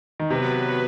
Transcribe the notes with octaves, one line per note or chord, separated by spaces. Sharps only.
D#3
C3 F#3 B3 F#4 B4